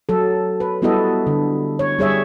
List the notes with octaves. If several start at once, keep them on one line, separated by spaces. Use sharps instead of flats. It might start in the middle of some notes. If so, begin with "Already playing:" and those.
F#3 A4
B4
G3 B3 E4 F#4 A4 D#5
D3
C#5
G3 G#4 C#5 E5